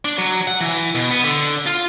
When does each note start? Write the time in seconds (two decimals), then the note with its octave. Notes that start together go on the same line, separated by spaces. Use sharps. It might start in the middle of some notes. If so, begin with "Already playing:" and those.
0.05 D4
0.18 F#3
0.47 F#5
0.61 E3
0.95 B2
1.11 B3
1.24 D3
1.66 F4